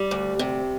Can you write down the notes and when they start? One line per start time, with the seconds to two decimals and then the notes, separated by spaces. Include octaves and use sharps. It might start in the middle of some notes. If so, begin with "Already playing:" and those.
Already playing: G3
0.11 D2
0.39 C3